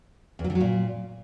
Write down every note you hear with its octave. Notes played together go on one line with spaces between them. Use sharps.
E2
F#3
D3
F#3
A#2